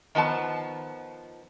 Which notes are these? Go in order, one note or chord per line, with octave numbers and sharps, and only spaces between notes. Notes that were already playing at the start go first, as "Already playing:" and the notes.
D#3 F3 B3 A5